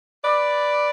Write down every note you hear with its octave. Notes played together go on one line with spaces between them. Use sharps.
B4 D5